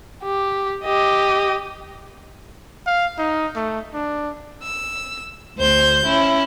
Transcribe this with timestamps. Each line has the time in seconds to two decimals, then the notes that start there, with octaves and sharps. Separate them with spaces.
0.23 G4
0.84 G4 D#5
2.87 F5
3.18 D#4
3.56 A3
3.94 D4
4.62 E6
5.57 D2 C5 G6
6.04 C#4 E4